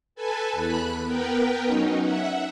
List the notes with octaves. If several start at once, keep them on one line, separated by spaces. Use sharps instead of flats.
A4 B4 G#5 A5
E2 B5 F#6
B3 A#4 B4 G5
F#3 C#4 D#4
E5 F#5